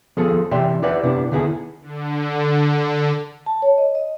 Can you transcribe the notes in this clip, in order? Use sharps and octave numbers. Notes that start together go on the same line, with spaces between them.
F3 B3 G#4 A4
C3 E3 D5 E5 G5 C6
E4 G4 B4 D5 E5 F#5
C3 B3 D4 E4
D3 D#3 B3 E4 G#4 A4
D3
A5
C#5
D#5
D#5